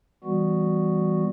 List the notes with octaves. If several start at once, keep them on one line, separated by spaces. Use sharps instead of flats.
E3 G3 B3 F#4